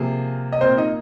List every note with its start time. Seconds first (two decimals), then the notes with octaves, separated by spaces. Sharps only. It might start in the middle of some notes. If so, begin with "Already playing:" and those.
Already playing: C3 F3 A#3 G#4
0.53 D#5
0.61 A#2 A#3 C4 C5
0.78 D#4 D#5